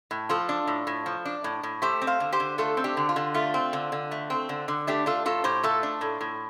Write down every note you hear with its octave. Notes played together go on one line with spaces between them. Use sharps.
A2
F3 F4 A4
D4
A2
A2
F3
D4
A2
A2
A3 G4 C5
C4
C5 F5
D3
G4 C5
D3
A3 F4 A4
C4
D4 G4
D3
F4
D3
A3 F4
C4
D3
D3
A3
C4
D3
D3
A3 D4 G4
D4 F4 A4
A2 F4 A4
A2 G4 C5
A3 F4 A4
D4
A2
A2